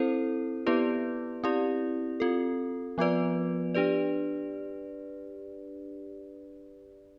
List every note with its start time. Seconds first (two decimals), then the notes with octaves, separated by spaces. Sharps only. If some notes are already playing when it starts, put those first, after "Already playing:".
Already playing: C4 E4 A4 C5
0.66 B3 E4 G4 B4 D5
1.44 C4 E4 G4 D5
2.20 C4 F4 A4
2.98 F3 B3 F4 B4 D5
3.75 D4 G4 B4 D5